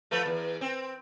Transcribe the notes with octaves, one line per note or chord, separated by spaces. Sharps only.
F3 A3 B4
E2
C4